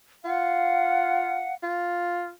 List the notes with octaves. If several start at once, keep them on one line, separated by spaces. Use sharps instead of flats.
F4 F5 F#5
F4